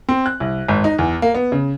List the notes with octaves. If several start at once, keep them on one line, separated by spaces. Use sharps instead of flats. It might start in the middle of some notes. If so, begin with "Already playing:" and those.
C4
F#6
C2
G#1
D#4
E2
A#3
B3
C#3